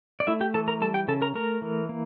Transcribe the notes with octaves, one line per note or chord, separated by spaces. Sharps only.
D5
A3 E4 E5
G4 G5
E3 A4 A5
A#4 A#5
G3 A4 A5
G4 G5
C#3 A4 A5
A#4 A#5
A3 A#4 A#5
E3
A#3